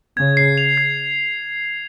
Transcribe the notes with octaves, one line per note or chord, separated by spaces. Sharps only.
C#3 G#6
C7
F7
G#6